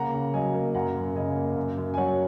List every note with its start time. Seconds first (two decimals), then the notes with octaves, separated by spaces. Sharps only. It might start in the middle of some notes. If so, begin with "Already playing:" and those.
Already playing: C#3 A#3 F#5 A#5
0.13 C#3
0.34 F#3 D#5 G#5
0.54 A#3
0.75 F#2 F#5 A#5
0.96 F#2
1.15 C#3 D#5 G#5
1.36 A#3
1.56 F#2
1.78 F#2
1.94 G#5
1.97 F#3 C#5 F#5